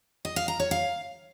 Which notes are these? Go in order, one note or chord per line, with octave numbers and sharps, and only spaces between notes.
D#5
F5
A#5
C#5
F5